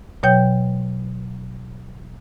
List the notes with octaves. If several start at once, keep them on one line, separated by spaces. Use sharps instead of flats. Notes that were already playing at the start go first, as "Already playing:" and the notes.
B2 F#3 C#5 G5 G6